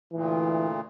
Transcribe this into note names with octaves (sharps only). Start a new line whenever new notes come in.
D2 A#2 E3